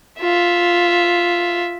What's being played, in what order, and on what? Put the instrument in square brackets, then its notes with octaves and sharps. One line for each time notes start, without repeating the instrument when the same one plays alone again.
[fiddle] F4 E5